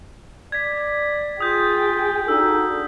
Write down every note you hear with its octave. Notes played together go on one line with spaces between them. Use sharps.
D5 G#6 B6
F4 G#4 G5 D#6 G6 B6
D4 D#4 F#4 A4 E6